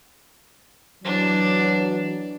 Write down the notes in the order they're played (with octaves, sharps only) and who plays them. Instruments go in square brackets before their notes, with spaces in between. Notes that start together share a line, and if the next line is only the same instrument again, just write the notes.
[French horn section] E3 F#3 [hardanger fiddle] D4